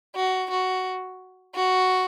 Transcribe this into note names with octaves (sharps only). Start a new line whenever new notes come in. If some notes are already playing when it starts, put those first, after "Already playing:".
F#4
F#4
F#4